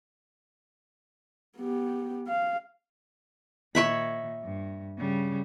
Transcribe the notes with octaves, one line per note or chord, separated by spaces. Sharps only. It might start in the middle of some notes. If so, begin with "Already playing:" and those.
B3 G4
F5
A#2 D#3 C#5 E5 B5
G2
C#3 G3